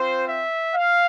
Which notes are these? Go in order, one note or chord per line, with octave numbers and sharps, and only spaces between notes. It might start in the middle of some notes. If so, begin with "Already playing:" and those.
Already playing: C4 F4 C5
E5
F5